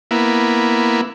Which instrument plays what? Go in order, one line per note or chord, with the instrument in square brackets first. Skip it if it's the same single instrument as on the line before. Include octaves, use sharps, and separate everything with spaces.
[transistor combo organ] A#3 B3 E4